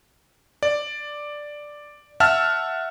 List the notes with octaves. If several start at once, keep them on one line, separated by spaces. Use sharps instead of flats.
D5
E5 F#5 A5 E6 F6